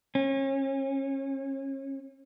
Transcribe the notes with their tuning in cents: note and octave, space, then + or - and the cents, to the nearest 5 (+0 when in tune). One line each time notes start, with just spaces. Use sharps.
C#4 -35